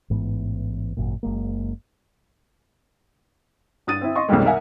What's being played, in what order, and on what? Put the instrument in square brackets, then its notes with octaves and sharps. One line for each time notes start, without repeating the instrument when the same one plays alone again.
[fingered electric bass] A1 G#2 E3 B3
G#1 F#2 A#2
F#1 G#3 A#3
[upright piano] G2 D#6 A6 D#7
C4 E4
D#5 C6 C#6
B1 F2 B2 D#3 G3 G#3
A#4 E5 F#5 G#5